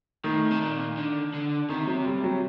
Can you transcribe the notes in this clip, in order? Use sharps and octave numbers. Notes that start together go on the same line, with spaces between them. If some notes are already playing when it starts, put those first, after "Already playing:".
A2 D#3
C3
A#2
D3
D3
C3 D#3
F#3
G3
F#3